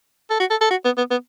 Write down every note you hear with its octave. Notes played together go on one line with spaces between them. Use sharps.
A4
F#4
A4
A4
F#4
B3
B3
B3